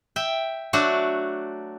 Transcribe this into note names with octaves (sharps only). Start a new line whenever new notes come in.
E5 G5
F#3 A3 D4 F#4 D5